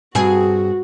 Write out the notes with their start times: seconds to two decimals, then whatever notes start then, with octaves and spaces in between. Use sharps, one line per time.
0.15 G2 C4 F#4 G#4